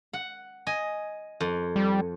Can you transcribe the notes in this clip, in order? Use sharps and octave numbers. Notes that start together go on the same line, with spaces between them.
F#5
D#5 G#5
F2
G3